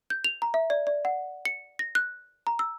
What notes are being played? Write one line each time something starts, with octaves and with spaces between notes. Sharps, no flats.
G6
F7
A#5
E5
D5
D5
F#5
C#7
A#6
F#6
A#5
E6